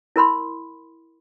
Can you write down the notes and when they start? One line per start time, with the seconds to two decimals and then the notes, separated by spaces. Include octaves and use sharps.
0.16 E4 A#4 B5 C6